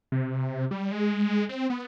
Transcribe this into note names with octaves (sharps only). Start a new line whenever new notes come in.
C3
G3
G#3
C4
B3